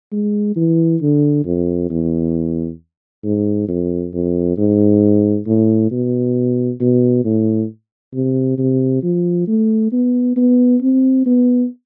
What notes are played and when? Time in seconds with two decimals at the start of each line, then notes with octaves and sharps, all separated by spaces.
0.12 G#3
0.56 E3
1.01 D3
1.45 F2
1.90 E2
3.24 G#2
3.68 F2
4.13 F2
4.58 G#2
5.47 A2
5.91 B2
6.81 B2
7.25 A2
8.14 C3
8.58 C3
9.03 F3
9.47 A3
9.92 B3
10.36 B3
10.82 C4
11.26 B3